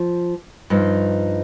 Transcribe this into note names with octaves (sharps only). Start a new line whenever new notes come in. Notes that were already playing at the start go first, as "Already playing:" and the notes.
Already playing: F3
G2 F3 D#4